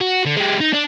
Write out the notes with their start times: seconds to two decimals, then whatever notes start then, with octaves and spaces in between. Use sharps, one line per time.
0.01 F#4
0.26 D3
0.37 G#3 G4
0.60 D#4
0.73 D4